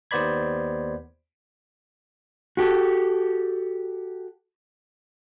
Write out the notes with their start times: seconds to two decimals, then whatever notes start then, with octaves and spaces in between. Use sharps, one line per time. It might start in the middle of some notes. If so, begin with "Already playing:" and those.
0.11 D#2 B3 C5 D5 B5 G#6
2.57 F#4 G4 A4